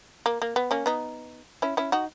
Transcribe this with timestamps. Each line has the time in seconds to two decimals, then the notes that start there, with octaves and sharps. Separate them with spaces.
0.26 A#3
0.42 A#3
0.56 B3
0.71 A#3 C#4
0.86 B3 D#4
1.62 C#4 E4
1.77 C#4 E4
1.92 D#4 F#4